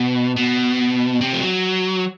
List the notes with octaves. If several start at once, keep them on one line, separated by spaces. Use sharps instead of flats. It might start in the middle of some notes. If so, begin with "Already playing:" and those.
Already playing: B2
B2
C3
F3
F#3